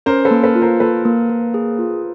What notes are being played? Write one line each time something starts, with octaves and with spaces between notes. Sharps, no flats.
C#4 A#4 C5
A4 B4
A#3
A4 B4
F4
A#4 C5
A#3 A4 B4
A#3
A#3
G#4
F4